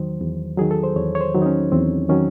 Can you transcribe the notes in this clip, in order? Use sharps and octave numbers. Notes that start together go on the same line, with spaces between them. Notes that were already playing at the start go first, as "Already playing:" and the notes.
Already playing: E2 D#3 F#3 C5
E2
D#3 F#3 G#4
A4
C5
E2 C#5
C#5
C5
D#3 F#3
D#4
C#4
E2 C4
D#3 F#3 C#4